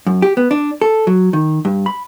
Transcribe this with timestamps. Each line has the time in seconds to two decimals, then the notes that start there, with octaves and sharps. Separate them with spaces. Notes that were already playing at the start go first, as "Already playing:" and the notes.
0.07 F#2
0.22 G4
0.37 B3
0.51 D4
0.82 A4
1.07 F#3
1.33 D#3
1.65 G2
1.86 B5